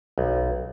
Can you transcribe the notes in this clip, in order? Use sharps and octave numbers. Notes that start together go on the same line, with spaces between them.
B1